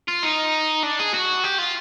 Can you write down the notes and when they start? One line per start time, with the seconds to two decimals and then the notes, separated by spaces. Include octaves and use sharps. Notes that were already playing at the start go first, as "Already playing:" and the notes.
0.08 F4
0.23 D#4
0.83 D4
0.99 G#4
1.14 F#4
1.44 G4
1.58 F4